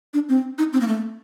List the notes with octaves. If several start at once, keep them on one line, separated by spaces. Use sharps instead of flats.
D4
C4
D#4
C4
A#3
A3